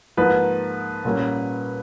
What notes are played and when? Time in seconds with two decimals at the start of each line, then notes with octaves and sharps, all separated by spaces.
0.17 G#2 F3 A#3 B4
1.05 A#2 G3 A#3 C#4